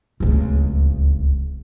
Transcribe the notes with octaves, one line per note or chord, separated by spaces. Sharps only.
D1 C#2